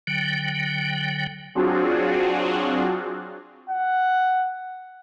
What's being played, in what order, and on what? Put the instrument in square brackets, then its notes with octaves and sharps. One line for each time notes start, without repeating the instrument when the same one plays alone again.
[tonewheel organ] D3 F#3 G5
[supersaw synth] F#3 C4 D4 F4 F#4 G#4
[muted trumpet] F#5